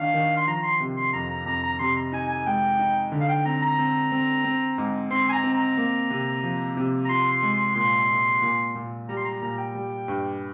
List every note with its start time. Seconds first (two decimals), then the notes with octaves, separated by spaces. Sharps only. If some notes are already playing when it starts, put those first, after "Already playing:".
Already playing: D#3 D4 F5
0.14 D#3
0.37 C6
0.47 F3 A#5
0.63 C6
0.80 C3
0.97 C6
1.13 F2 A#5
1.30 A#5
1.46 F2 A#5
1.63 A#5
1.79 C3 C6
1.96 A#5
2.12 D#4 G#5
2.29 G#5
2.46 G#3 G5
2.79 D#4
3.12 D3
3.20 F5
3.29 G5
3.45 C4 A#5
3.62 A#5
3.79 C4
4.12 C4
4.44 C4
4.78 G#2
5.10 C4 C6
5.29 G#5
5.32 A#5
5.44 C4
5.55 A#5
5.77 A#3
6.10 C3
6.43 F3
6.77 C3
7.05 A#5
7.09 F4 C6
7.32 C6
7.42 G#3
7.53 C6
7.75 A#2 C6
8.10 A#2
8.42 A#2
8.75 A#2
9.08 G3 A#5
9.17 C6
9.25 A#5
9.41 A#2 A#5
9.58 G5
9.75 G3
10.08 G2